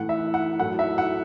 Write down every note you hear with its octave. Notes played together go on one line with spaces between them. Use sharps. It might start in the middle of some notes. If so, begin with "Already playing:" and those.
Already playing: A2 E3 A3 F#5
E5
F#5
A2 F#3 A3 F#5
E5
F#5